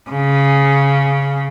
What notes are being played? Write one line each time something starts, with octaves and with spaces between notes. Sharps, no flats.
C#3